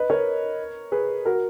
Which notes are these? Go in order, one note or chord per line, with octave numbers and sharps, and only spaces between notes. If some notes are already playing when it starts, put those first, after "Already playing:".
Already playing: B4 D#5
A#4 C#5
G#4 B4
F#4 A#4